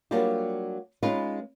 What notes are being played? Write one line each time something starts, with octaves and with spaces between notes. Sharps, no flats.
F#3 G3 A#3 D4 F4 G4
G#3 C#4 D#4 F4 B4